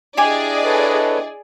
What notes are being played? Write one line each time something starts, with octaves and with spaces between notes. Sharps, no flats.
D4 E4 G4 G#4 D5 D#5 G#5 D6
A4 B4 C#5